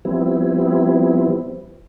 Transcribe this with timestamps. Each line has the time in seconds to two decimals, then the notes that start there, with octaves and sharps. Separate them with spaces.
0.05 F3 G3 B3 C4 E4